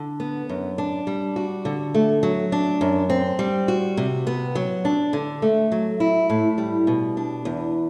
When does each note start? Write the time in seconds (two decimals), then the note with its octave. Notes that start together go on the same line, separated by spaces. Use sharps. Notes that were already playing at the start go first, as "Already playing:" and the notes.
Already playing: D3
0.20 B3
0.49 F#2
0.78 D4
1.07 G3
1.36 F#4
1.65 D3
1.94 A3
2.23 F#3
2.52 D4
2.81 F#2
3.10 C4
3.39 G3
3.68 F#4
3.97 C3
4.27 B3
4.55 F#3
4.85 D4
5.13 D3
5.42 A3
5.72 F#3
6.00 E4
6.30 A2
6.58 G3
6.87 B2
7.17 D4
7.45 E2